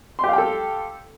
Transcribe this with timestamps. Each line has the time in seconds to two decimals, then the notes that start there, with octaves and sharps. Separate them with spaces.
0.19 C6
0.24 G4
0.28 F5
0.33 G5
0.38 A4